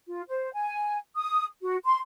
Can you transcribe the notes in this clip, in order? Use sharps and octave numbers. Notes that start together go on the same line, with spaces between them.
F4
C5
G#5
D#6
F#4
C6